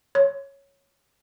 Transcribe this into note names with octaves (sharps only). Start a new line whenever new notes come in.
C#5